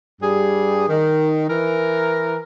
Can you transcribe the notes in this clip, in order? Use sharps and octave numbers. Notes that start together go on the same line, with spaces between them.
G2 G3 G#4
D#3
E3 A#4